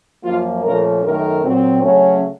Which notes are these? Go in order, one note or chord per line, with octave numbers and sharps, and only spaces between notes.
F#2 F3 A#3 F4
A#2 F3 A3 C#4 A#4
F#2 D#3 A3 A#4
A#2 F#3 C4
C#3 F#3 A3 C#4